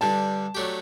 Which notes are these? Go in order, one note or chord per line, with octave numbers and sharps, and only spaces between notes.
G2 D3 G3 A5
F#3 A3 D4 G4